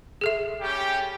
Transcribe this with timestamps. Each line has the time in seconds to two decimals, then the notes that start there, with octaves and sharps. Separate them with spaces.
0.21 G#4 A4 E5
0.60 G3 C#4 G4